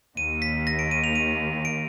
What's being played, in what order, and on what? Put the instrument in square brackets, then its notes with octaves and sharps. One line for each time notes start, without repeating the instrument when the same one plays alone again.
[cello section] D#2 D#3 A#3 [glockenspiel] D#7
[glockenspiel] B6
A#6
D7
D#7
F7
D#7
D7